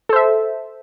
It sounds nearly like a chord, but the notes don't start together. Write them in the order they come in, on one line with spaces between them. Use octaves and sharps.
A4 C5 E5